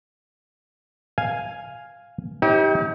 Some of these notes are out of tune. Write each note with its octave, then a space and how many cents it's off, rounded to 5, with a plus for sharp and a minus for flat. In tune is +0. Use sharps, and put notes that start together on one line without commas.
F5 +0 G#5 +0
D#4 +45 G4 +0 C#5 -20